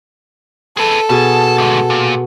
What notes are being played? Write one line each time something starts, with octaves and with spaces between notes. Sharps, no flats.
G#4 A4 B4
B2 G#4 A5
D2 G#2
A#2